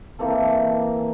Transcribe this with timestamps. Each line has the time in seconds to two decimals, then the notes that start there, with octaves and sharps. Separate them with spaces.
0.19 E3 A#3 C4 A4